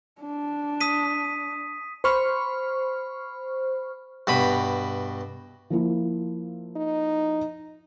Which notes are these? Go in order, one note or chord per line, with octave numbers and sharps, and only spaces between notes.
D4
D#6 B6 D#7
C5 B5 C#6 F6
G2 B2 B5
F3 A#3 E4
D#4